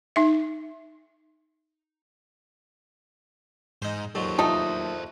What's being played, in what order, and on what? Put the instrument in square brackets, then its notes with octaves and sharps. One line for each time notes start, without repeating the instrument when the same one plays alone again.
[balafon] D#4 E5
[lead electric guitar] G#2 [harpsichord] D#4 C5
[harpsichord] D#2 A#2 F#3 [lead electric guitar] A4 C5
[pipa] A3 D#4 [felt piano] F4 A5